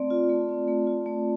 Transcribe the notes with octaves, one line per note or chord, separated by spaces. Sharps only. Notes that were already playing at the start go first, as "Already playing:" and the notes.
Already playing: A3 C4 D5
F4
A3
C4
A3
F4
A3